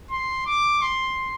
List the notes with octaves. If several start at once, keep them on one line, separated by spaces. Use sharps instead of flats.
C6
D6
C6